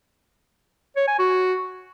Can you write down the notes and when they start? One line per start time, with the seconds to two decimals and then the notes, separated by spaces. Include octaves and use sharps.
0.96 C#5
1.08 G#5
1.19 F#4